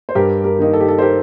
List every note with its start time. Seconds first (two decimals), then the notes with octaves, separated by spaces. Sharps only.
0.09 C5
0.15 G2 G4 A#4
0.44 G4 A#4
0.59 D#3 A#3 D#4
0.73 A4
0.80 G4
0.88 A4
0.99 C5
1.02 G4 A#4